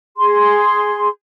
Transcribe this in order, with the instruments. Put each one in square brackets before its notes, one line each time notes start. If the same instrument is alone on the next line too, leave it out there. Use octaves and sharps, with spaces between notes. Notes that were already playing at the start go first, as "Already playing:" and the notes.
[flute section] G#4 C6